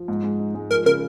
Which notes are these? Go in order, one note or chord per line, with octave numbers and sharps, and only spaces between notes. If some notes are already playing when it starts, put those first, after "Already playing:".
Already playing: F3
G#2
G#3
D#4
G#3
F3 A#4
C#3 A#4